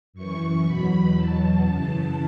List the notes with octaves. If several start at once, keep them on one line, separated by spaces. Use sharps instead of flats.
F#2 E3 C#6
E2 B2 F#3 B5
E2 B2 F#3 A5
F#2 C#3 E3 A5